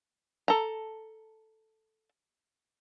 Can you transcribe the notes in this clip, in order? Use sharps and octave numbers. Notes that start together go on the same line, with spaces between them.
A4 A#5